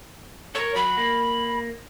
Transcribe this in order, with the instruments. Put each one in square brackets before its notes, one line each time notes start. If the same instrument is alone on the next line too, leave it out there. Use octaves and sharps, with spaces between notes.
[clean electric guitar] A4 A#4 [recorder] C#5
[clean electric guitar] F#3 [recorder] B5
[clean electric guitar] A#3